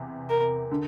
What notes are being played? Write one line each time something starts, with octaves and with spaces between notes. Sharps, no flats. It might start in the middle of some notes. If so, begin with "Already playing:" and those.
Already playing: E2 C3
A#4
D3